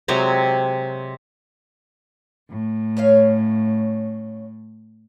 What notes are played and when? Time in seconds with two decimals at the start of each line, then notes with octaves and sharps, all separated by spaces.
0.08 C3 F#3 G#3 C4
2.49 A2
2.97 C#4 C#5 F5